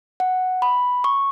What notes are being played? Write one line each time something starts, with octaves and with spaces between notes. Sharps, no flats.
F#5
B5
C#6